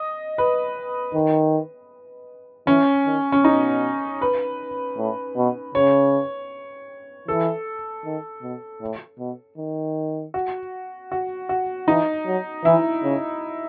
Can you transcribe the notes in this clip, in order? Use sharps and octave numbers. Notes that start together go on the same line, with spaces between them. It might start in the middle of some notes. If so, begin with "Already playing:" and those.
Already playing: D#5
B4
D#3
E3 C#4
D#3
C#4
B2 D#4
B4
A2
B2
C#3 C#5
E3 A4
D#3
B2
A2
B2
D#3
F#4
F#4
F#4
E3 D#4
F#3
E3 E4
C#3